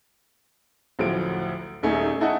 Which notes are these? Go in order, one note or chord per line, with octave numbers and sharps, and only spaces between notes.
A1 D2 F3 F#3 D7
D#1 A3 C#4 D#4 G#4
A3 D#4 E4 A4 D#5 F#5